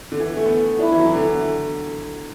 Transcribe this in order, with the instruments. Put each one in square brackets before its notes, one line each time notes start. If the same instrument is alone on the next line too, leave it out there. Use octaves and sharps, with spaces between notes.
[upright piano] D3
E3
A3
B3
[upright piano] D4 [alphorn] E4
[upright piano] E3
F#3
E3
D3